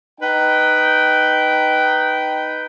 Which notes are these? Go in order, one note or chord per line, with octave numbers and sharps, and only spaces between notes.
D#4 B4 G5